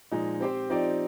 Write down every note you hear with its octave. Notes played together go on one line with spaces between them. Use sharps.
A#2 F3 G#3 D#4
C4 G4 C5
F3 C4 D#4 G4 D5